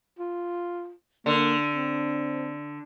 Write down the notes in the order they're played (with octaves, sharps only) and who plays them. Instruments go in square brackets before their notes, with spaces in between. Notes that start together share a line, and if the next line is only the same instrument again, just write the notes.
[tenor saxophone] F4
[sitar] D3 [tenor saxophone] A#3
[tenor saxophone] C4